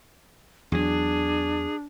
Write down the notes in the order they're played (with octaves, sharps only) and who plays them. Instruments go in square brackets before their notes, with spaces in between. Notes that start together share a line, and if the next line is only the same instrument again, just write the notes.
[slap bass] E2 F#3 [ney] D4 [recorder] G#4